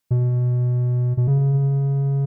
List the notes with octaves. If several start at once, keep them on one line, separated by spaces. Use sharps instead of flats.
B2
B2
C#3